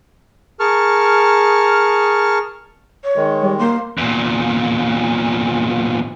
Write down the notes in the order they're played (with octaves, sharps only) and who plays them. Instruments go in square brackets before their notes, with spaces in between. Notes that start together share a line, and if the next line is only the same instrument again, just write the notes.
[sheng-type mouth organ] G#4 A#4 A5 C#6 F6
[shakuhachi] C#5
[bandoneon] D#3 G#3
[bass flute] G3
[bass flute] A#3 [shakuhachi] C6
[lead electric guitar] E2 A#2